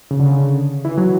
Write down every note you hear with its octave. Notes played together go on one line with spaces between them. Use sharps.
C#3
D3
C#3
E3
F#3